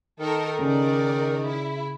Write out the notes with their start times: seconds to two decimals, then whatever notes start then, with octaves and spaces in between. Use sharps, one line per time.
0.20 D#3 A4 A#4
0.59 C#3 A#4 D5
1.46 E4